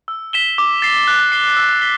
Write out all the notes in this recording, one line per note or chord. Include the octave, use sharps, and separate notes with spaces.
E6
B6 E7 G7
D6
A6 C7
F#6
C7 G7
E6
B6 G7